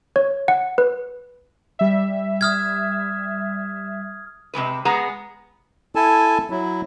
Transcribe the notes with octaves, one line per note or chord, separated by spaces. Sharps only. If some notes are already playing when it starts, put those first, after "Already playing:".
C#5
F#5
B4
G3 E5
D#6 F6 G#6
C3 E3 G#3 B4
G#3 B3 G#4 F#5 A#5
E4 A4 G#5 A5
F#3 E4